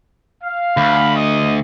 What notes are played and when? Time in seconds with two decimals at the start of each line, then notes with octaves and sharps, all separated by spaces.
0.43 F5
0.77 D2 B5
1.16 D#5